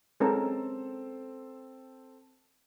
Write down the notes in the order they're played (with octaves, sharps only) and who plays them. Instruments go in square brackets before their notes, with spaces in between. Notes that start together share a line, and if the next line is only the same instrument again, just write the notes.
[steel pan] G#3 C#4 A#4 [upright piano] C4 A4